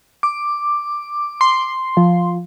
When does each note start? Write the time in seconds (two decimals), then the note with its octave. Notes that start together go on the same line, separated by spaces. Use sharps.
0.23 D6
1.41 C6
1.97 F3